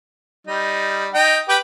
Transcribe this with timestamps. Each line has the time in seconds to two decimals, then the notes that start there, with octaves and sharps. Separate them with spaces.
0.47 G3 D#4
1.14 D#4 G5
1.49 G4 B4 G5